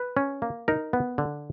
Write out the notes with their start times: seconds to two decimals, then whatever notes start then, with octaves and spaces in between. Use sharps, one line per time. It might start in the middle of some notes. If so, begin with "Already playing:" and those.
Already playing: B4
0.17 C#4
0.42 A#3
0.68 D#4 A#4
0.93 B3
1.18 D3